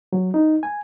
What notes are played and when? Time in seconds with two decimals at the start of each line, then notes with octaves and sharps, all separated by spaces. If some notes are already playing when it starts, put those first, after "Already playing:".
0.13 F#3
0.34 D#4
0.63 G#5